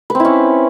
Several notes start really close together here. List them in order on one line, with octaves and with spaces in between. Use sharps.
B4 C4 E4 C#4